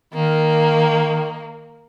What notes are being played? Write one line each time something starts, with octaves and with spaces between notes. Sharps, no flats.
D#3 A#3